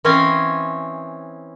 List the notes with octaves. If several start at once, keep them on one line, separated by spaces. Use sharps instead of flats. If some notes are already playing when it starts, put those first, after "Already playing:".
E3 C4 C#4 D#5 F5 G#5